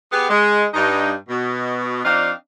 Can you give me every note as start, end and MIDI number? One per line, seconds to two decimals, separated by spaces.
0.12 0.28 59
0.12 0.28 67
0.12 0.28 68
0.29 0.65 56
0.74 1.11 43
0.74 1.11 63
1.28 2.02 47
2.04 2.30 53
2.04 2.30 60
2.04 2.30 62
2.04 2.30 63
2.04 2.30 74
2.04 2.30 77